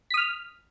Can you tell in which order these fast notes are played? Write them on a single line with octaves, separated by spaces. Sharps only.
B6 D#6 F6